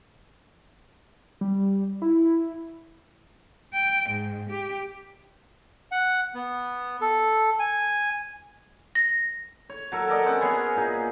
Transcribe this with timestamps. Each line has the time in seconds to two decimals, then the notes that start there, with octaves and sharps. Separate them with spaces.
1.41 G3
2.02 E4
3.73 G5
4.08 G#2
4.48 G4
5.92 F#5
6.35 B3
7.01 A4
7.59 G#5
8.95 A#6
9.69 C#5
9.92 F#3 A4 A#4
10.08 A4 A#4 D5 D#5
10.26 C4 C#4 D#5 F#5
10.41 B3 C#4 G#4 C#5
10.76 A#2 D#4 G#4